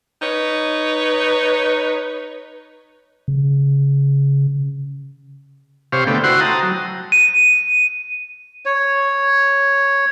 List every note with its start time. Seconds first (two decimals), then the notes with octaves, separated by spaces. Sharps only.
0.21 D#4 B4 C#5
3.28 C#3
5.92 C3 G4 C5 C#5 F5
6.07 D3 A3 B3 G5
6.24 E4 F#4 C5 F#5 G5 C6
6.40 G5 A5 A#5 D#6
6.63 F#3
7.12 D#7
8.65 C#5